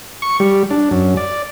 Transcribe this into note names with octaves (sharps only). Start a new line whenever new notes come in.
C#6
G3
D4
F#2
D5